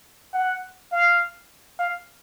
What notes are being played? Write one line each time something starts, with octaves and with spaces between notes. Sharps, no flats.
F#5
F5
F5